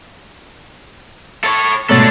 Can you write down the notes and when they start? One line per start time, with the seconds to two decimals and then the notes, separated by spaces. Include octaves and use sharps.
1.44 A4 C#5
1.89 C2 G#2 B2 A3 D4 A4 C#5 A6